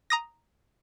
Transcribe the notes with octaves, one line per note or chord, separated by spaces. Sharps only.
A#5 D#6 A#6